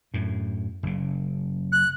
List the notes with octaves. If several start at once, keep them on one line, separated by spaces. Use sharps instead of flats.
F#2 A2
F#1 C#3
F#6